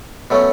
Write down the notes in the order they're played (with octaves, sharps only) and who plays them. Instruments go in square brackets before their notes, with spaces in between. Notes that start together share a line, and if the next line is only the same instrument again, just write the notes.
[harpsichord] B2 F#3 A3 C#4